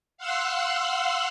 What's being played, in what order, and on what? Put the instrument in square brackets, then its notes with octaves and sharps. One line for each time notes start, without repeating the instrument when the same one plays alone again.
[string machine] F5 F#5 C6 E6 F#6